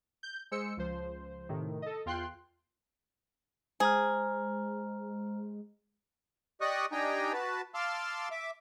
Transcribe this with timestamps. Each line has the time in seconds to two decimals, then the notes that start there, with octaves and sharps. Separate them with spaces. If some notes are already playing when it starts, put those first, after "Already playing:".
0.23 G6
0.51 G#3 C5 E6 C#7
0.77 C#2 F3 C5
1.49 A2 C3 D#3
1.82 A4 D#5
2.06 E2 F4 G5 C6 F#6
3.80 G#3 G#4 C5 A#5 F6
6.61 G4 D5 D#5 C#6 D#6 F#6
6.92 D4 D#4 G4 G5 G#5 A#5
7.33 F#4 B4 A5
7.74 F5 A5 C6 D6 E6 F6
8.31 E5 D6